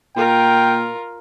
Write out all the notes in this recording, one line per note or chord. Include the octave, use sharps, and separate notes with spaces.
A#2 F4 A#4 G5